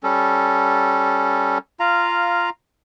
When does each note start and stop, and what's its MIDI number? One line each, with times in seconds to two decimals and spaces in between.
0.03 1.58 55
0.03 1.58 61
0.03 1.58 69
1.80 2.50 65
1.80 2.50 77
1.80 2.50 82